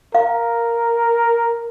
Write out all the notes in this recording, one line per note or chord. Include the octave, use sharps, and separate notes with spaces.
A#4 F5